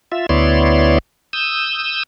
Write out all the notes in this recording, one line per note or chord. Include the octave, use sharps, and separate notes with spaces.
F4 E5
D2 B3 E4 C#5 D5 C6
D#6 E6 G6